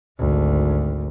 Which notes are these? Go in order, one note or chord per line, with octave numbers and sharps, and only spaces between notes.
G#1 D2